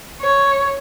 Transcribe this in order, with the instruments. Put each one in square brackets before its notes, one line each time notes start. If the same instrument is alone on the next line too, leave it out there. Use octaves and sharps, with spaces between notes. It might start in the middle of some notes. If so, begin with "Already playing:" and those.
[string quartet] C#5